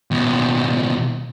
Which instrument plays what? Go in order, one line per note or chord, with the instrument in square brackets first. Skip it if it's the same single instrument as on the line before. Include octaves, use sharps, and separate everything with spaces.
[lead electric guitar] D#2 B2